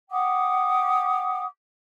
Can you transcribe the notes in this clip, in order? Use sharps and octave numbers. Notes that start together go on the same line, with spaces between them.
F#5 G5 D6 D#6